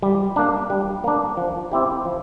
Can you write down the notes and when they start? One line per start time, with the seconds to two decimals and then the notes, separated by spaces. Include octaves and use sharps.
0.02 G3
0.36 A#3 D4
0.70 G3
1.04 A#3 D4
1.37 F3
1.72 C4 E4 G4
2.05 F3